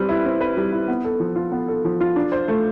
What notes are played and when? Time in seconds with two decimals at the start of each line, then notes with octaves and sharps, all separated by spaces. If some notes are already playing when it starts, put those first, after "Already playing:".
Already playing: G3 C4 B4
0.09 E4
0.26 C4
0.41 B4
0.57 G3
0.72 E4
0.88 B3
1.04 A4
1.20 F3
1.36 F4
1.52 B3
1.68 A4
1.85 F3
2.00 F4
2.16 D4
2.32 C5
2.48 A3